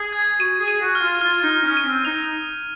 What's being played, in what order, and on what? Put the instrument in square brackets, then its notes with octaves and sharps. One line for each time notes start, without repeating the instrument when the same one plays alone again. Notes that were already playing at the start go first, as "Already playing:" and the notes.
Already playing: [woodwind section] G#4
[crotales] G#6
[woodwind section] F#4 [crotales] D#7
[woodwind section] G#4
[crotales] D#7
[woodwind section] F#4
[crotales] F6
[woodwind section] F4
[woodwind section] F4 [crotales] F6
[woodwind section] D#4
[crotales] F6
[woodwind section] C#4
[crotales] D#7
[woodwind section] C4
[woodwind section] D#4 [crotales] F7